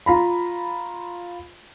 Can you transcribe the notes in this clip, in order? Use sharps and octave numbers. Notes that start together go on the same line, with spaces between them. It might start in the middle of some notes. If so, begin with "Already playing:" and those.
F4 A#5 B5